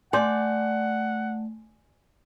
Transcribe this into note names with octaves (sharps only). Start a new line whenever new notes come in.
A3 D5 F#5 G#5 C6 G6